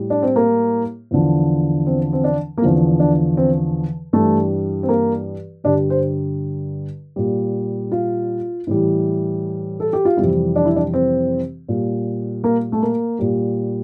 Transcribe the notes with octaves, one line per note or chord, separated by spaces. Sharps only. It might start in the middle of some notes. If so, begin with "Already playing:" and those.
Already playing: A2 G3
D4
C4
A#3
E2 D3 F3
C4
C4
D4
A#3
E2 D3 F3 C4
D4
C4
G2 E3 G3 A3
C4
A#3
G2 D3 G3 D4
C5
A#2 G3
F4
A2 E3 G3
A4
G4
F4
F2 C3 E3 G3 E4
D4
E4
D4
C4
A#2 G3
A#3
A3
A#3
A#2 G3